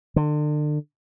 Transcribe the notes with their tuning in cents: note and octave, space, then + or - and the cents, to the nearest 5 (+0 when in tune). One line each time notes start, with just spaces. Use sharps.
D3 +35